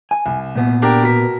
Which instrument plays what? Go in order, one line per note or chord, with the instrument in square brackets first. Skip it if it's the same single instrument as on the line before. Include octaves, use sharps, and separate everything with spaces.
[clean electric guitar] G#5
[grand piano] C2
[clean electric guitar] A#2 B3
[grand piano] D4 G4 A#4
B2 A#4 B6